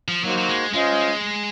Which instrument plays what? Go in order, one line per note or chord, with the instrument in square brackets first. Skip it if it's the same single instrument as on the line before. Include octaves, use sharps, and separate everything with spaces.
[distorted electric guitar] F3
[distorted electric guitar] F#3 [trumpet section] A#3 D#4 F#4 C5
[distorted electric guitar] F#3
G#3
[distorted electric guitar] G#3 [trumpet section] C#4 F4 C5 D#5